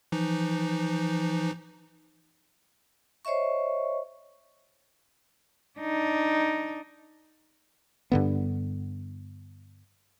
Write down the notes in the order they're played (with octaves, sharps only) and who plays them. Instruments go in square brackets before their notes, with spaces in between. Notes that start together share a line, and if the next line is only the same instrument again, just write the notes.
[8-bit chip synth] E3 F3 D#4
[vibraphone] C5 C#5 D#5 E5 C#6
[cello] D4 D#4
[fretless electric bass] G2 D3 B3